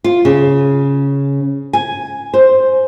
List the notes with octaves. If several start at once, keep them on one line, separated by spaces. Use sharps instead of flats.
F4
C#3
G#5
C5